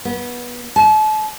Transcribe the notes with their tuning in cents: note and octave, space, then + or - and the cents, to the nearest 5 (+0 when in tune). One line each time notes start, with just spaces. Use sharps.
B3 -20
A5 -35